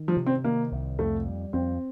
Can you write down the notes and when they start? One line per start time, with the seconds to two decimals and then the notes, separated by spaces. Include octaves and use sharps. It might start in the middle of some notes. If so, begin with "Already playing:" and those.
Already playing: D#3
0.08 F3
0.17 C3
0.26 C4
0.44 D#3 A#3
0.72 C2
0.99 F2 A3
1.27 G3
1.53 F2 C4